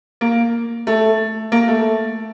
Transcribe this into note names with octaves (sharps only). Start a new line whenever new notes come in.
A#3
A3
A#3
A3